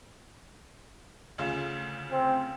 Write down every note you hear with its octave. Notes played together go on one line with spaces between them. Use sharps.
D2 C#3 F4
C4